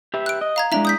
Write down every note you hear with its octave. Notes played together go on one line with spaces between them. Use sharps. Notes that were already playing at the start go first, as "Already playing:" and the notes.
G4 B4 E5
F#6 D7
D#5
F5 A#5 G#6
G#3 D4 E4 E5 A#5
D#6 G6 B6